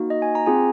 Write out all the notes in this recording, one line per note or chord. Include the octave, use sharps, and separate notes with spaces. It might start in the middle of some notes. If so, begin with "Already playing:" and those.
Already playing: A#3 D#4 F#4
D#5
G#5
A#5
C4 F4 G#4 G#5